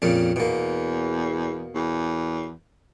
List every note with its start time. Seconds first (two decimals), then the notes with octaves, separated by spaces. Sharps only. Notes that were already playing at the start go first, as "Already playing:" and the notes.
0.02 F2 A#2 C#3
0.36 E2 B2 A#3
1.75 E2